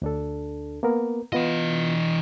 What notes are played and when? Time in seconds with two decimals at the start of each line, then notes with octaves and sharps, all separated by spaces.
0.02 D2 D4 A4
0.83 A#3 B3 A#4
1.33 E3 B3 F4 D#5